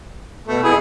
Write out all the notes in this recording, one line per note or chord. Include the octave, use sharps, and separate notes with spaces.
B2 A3
F2 B3 E4 G#4